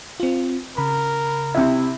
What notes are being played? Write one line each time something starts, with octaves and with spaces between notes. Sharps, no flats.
C4 F4
C#3 A#4 B5
C3 E4